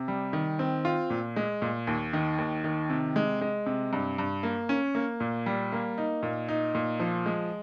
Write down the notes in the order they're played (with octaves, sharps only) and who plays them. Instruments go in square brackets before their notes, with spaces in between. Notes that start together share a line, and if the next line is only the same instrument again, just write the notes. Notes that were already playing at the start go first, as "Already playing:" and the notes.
Already playing: [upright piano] C3
G3
D#3
C4
F4
A#2
G#3
A#2
D#2
D#3
D#2
D#3
C3
G#3
G#3
C3
G2
G2
A#3
C#4
A#3
A#2
G3
A#3
D#4
A#2
D#4
A#2
F3
G#3